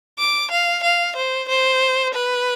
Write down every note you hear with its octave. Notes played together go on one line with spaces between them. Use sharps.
D6
F5
F5
C5
C5
B4